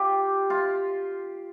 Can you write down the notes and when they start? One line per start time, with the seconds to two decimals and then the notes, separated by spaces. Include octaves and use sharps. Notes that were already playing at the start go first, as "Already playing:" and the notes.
Already playing: F4 G4
0.50 F4